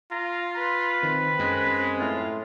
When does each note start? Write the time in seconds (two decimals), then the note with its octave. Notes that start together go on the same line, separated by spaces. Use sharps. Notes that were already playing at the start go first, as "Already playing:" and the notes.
0.11 F4 A#5
0.56 B4
1.03 D#3 C4
1.39 F#2 G#3
1.99 A2 F4